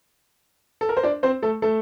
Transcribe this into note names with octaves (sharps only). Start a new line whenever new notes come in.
A4
A#4
C5
D4 D5
C4 C5
A3 A4
A3 A4